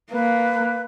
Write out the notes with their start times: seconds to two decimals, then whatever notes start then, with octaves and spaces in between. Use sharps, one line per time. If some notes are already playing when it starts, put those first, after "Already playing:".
0.12 A#3 B4